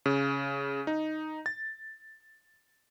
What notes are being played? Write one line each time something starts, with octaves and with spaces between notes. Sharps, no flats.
C#3
D#4
A6